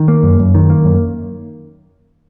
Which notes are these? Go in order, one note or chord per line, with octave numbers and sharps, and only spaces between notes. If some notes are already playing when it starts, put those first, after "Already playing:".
Already playing: D#3
A#3
F#2
F#2
D#3
A#3
F#2